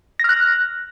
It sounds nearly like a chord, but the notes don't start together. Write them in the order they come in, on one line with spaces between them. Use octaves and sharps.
A#6 F6 F#6